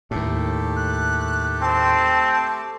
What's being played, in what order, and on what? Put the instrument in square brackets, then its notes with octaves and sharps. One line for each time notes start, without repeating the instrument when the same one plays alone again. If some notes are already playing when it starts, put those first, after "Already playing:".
[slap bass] D#2 A2 [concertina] A3 G4 A4
[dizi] F#6
[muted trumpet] C4 [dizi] A5